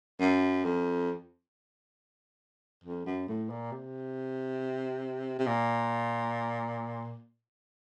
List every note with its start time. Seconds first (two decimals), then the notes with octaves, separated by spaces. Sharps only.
0.20 F#2
0.65 F2
2.84 F2
3.06 F#2
3.28 A2
3.50 A#2
3.72 C3
5.39 C3
5.47 A#2